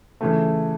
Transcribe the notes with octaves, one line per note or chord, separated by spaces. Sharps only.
C#3 E3 A3